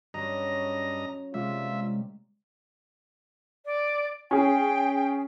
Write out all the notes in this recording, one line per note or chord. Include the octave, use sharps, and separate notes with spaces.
G2 F#3 C#4 F#4 D#5 A#5
C3 G3 G#3 A#3 F4 E5
D5
C#4 G#4 G5